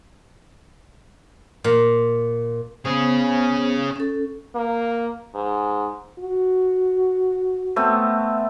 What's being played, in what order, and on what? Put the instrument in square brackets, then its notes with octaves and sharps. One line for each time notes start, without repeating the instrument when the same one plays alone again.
[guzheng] A#2
[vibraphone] B3 C5 [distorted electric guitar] C#4 G#4
[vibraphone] C#4 A4
[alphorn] A#3
G#2
[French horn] F#4
[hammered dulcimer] A3 B3 C4